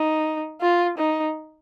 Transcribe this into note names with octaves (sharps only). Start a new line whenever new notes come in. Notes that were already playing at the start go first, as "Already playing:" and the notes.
Already playing: D#4
F4
D#4